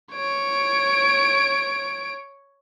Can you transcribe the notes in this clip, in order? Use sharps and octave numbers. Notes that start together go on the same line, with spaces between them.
C#5 D7